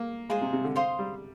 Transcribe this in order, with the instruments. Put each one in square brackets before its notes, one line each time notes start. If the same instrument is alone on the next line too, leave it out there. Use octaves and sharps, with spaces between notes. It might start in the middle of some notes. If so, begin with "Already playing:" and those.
Already playing: [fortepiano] A#3
[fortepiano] G#3 [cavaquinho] F4 G#4 C5
[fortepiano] C3
C3
D3
[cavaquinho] C5 F5 C6 D#6
[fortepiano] G3